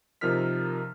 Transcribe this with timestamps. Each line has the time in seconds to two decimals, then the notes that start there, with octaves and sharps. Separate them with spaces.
0.21 C3 F3 D#4 A#4 F6 B6